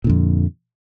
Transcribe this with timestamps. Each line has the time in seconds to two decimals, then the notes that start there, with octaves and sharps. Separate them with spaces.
0.04 A#2
0.07 D3
0.09 F2